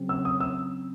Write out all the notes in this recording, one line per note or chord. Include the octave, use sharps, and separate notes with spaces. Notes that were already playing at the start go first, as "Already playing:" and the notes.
Already playing: C#3 F#3 C4
E6
D#6
E6